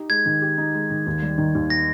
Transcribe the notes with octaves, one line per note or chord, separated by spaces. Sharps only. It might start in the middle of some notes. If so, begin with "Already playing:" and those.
Already playing: D#4 G4
G#3 G#6
D#3
G4
D#4
G#3
D#3
D#2
G3
D#3
D#2
A#6